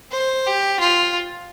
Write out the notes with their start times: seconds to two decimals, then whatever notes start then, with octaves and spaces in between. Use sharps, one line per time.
0.12 C5
0.47 G4
0.80 F4